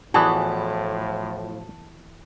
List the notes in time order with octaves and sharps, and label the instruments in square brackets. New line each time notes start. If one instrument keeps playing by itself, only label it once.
[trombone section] A2 F3 [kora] E3 B3 [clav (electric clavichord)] F#4 G#4 D5 [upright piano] A5